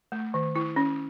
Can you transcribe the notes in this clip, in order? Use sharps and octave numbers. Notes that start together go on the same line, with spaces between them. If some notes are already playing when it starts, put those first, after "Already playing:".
A3
D#3
E4
C#4